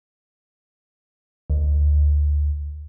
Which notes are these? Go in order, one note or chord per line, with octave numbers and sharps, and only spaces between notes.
D2